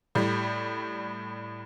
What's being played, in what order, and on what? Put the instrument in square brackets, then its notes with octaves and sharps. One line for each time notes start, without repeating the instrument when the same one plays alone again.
[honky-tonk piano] A2 G3